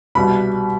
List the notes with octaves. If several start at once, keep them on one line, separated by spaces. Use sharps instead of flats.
C2 B2 G3 B5